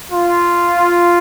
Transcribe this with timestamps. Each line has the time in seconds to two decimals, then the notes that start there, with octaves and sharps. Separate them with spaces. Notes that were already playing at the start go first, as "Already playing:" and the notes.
0.11 F4